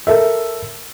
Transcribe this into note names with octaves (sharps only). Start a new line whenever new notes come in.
A4 A#4 E5